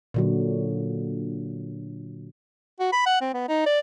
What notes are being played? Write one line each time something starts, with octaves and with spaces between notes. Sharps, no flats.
A#2 D3 F#3
F#4
B5
F#5
C4
B3
D#4
D5